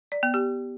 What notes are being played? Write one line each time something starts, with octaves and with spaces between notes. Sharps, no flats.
D5
B3
G4